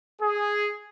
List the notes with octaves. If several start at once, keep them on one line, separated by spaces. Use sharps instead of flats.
G#4